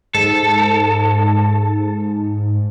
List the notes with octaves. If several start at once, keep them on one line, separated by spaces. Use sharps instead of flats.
G#2 A4